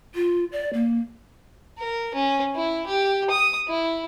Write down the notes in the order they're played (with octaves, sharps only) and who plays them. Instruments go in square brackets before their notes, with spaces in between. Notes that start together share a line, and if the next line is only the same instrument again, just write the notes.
[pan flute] F4
D5
A#3
[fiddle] A#4
C#4
E4
G4
D#6
E4